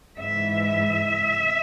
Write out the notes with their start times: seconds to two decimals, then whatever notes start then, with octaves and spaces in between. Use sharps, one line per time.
0.18 G#2 E3 G#3 E5